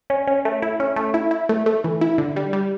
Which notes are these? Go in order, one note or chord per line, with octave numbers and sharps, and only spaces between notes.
C#4
C#4
A3
E4
C#4
A3
E4
E4
A3
A3
E3
E4
D3
G3
G3